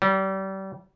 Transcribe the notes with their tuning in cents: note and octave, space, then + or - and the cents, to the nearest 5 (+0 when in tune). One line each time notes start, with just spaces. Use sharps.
G3 -30